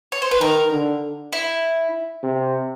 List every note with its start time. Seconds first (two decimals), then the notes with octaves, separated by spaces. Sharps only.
0.12 C#5
0.22 C5
0.31 B4
0.41 D#3 A#4
0.72 D3
1.33 E4
2.23 C3